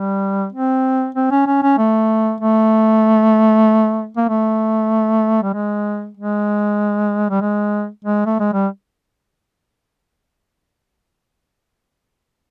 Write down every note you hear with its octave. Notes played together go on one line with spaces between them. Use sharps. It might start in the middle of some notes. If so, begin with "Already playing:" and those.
Already playing: G3
C4
C4
C#4
C#4
C#4
A3
A3
A#3
A3
G3
G#3
G#3
G3
G#3
G#3
A3
G#3
G3